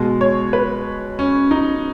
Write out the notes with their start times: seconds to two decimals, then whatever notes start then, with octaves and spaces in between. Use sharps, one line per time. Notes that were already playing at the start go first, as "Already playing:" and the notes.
Already playing: B2 G#3
0.21 C#5
0.53 B4
1.19 C#4
1.51 D#4